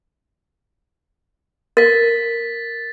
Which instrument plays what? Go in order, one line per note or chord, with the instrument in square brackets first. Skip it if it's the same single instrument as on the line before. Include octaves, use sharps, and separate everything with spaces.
[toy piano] A#4 [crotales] A6 B6